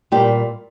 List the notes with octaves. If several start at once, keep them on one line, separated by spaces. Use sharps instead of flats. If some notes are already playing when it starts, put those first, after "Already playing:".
A#2 G3 G4